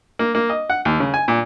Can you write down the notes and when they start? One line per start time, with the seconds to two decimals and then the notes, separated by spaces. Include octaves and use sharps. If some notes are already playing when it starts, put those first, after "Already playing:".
0.19 A#3
0.35 A#3
0.49 D#5
0.70 F#5
0.85 D#2
1.00 C#3
1.14 G#5
1.28 A#2